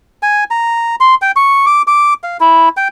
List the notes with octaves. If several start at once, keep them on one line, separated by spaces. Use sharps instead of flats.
G#5
A#5
C6
G5
C#6
D6
D6
F5
E4
G5